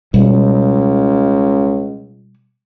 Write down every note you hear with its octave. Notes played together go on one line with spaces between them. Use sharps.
C#2 B2 G3